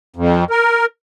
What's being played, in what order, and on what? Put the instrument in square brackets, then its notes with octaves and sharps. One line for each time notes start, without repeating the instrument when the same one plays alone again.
[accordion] F2
A#4